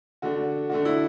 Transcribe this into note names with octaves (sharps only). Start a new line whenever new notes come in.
D3 A3 D4 F#4
D3 A3 D4 F#4
E4